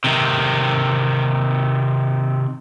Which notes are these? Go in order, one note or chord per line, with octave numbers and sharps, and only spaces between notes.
C3 D#3